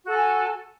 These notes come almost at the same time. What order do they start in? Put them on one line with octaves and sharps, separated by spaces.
F#4 A4 G#5